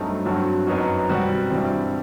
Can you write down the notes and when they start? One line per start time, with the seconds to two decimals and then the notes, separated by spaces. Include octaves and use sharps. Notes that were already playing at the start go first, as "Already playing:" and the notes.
Already playing: G2 F#3 A3 C4 D#4
0.25 G2 F#3 C4 F#4
0.67 F#2 F#3 B3 D#4 F#4
1.09 B2 G3 C4 F#4
1.51 G2 E3 G3 C4